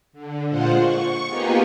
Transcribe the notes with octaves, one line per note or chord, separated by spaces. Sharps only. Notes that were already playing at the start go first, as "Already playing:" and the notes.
D3
A#2 G#3 F4 C5 F#5
C#6
A#3 B3 D#4 F4 G4 G#4